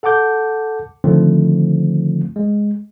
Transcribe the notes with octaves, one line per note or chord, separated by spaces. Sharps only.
A4 F#5 A5 D6 G6
D3 D#3 F3 A3 C4
G#3